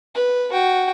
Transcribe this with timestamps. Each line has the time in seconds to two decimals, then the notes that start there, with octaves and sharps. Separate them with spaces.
0.15 B4
0.52 F#4 G5